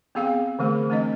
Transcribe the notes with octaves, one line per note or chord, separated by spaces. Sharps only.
B3 C4 G#4 F5 G5
D3 E3 A3 G#4
A3 C4 D4 D#5